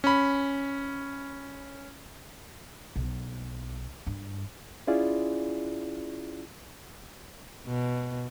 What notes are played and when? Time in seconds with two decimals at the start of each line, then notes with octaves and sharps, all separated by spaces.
0.04 C#4 B5
2.96 B1
4.07 G2
4.87 C#4 E4 F4 G#4 D5
7.67 B2